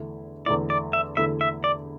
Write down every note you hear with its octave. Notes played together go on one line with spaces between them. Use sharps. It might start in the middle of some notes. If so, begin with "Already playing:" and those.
Already playing: E2 D3 A3 E4
E2 D3 A3 E4 D5
D5
E5
E2 D3 A3 E4 E5
E5
D5